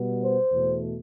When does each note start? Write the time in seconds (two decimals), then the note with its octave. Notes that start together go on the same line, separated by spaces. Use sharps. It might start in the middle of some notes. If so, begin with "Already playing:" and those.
Already playing: B2 G3 B3
0.23 C5
0.51 E2 B2 A3